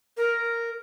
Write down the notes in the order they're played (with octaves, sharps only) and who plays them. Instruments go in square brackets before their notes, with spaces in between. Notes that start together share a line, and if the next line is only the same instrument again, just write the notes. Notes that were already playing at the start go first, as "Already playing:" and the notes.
[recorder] A#4